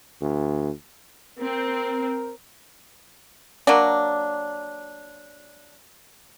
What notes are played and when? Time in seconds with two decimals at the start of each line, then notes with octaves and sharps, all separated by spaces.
0.21 D2
1.39 C4 A#4
3.67 F#3 A#3 D4